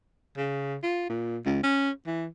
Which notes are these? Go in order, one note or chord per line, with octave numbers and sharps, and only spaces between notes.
C#3
F4
A#2
C#2
C#4
E3